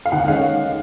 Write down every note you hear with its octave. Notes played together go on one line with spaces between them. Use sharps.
F5
D#2 F#5
D#3 G#3 C#4 F5